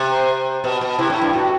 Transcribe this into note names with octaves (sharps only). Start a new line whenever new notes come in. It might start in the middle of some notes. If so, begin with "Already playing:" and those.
Already playing: C3
C5
B2
B2
C3 E4
A2
G2 E4
A2 F#4